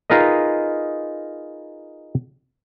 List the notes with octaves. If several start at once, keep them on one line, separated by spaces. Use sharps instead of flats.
D#4 F4 G#4 A#4 B4 D#5